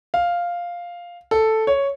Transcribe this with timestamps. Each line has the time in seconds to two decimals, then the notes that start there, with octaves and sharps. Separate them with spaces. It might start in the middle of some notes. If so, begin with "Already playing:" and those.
0.14 F5
1.31 A4
1.67 C#5